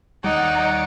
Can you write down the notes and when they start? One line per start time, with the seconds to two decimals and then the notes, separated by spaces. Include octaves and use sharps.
0.24 D#2 G3 D#4 C#5 D5 F#5